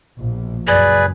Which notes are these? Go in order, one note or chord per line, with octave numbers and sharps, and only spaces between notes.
A#1 B2
C#2 F#2 G#4 B4 D5